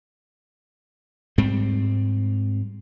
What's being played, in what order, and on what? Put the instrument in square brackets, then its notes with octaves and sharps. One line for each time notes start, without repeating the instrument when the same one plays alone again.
[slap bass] G#2 G3 C4